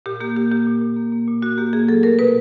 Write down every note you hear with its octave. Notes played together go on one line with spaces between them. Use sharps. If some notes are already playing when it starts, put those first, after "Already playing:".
A#2 G4
A#3 G4
A#2 G4
A#3 G4
A#2
A#2
A#3
A#3
A#2
A#2 F#4
A#3 G4
A#3 G#4
F#3 A4
A3 A#4
B2 B4